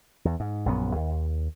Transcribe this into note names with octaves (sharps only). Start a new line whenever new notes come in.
E2
G#2
A#1 F#2 B3
D#2